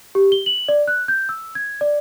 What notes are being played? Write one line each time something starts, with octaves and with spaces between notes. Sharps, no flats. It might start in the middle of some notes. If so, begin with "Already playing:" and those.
G4
G7
F#7
D5
F#6
G6
E6
G#6
D5